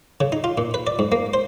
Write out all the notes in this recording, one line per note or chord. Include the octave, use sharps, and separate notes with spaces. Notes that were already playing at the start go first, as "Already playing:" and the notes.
C#3
D#4
F4
A#2
B4
D5
G#2
A#3
C5